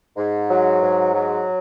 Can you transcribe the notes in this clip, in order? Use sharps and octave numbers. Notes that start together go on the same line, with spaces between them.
G#2
F#3
G#2
F#3